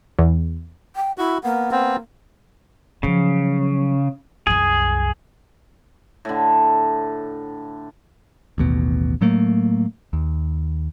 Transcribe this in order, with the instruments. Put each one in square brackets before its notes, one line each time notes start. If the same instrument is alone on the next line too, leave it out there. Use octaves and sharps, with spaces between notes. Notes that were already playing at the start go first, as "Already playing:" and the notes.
[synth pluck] E2
[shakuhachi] G5
[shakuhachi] E4 [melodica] F#4
[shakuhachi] A#3 [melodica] B3
[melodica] B3 C4
[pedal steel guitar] C#3 [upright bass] F3 F#3
[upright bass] C2 F#2 [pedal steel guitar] G#4
[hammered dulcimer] A2 D3
[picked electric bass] A1 D#2 B2
A2 F#3 A3 A#3
D#2